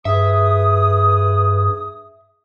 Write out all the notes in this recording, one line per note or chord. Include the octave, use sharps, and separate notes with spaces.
G2 G#4 B4 E5 D#6